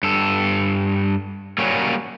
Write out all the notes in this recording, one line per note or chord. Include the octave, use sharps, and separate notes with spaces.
G2 A4
F#3 G3 A#3 C#4